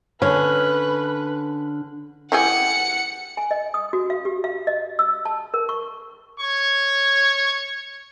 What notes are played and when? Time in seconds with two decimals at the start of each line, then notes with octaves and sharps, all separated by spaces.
0.22 D3 C#4 B4
2.32 E3 G4 G#4 F#5 C#7
3.37 G#5
3.51 D#5
3.74 D#6
3.93 F#4
4.10 F5
4.25 G4
4.44 F5
4.67 D#5
4.99 E6
5.25 A5
5.54 A#4
5.69 C#6
6.40 C#5 C#6